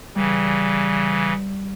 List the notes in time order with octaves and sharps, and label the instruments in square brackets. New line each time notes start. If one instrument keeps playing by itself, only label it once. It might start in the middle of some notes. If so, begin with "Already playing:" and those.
[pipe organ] C#3 E3 [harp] G3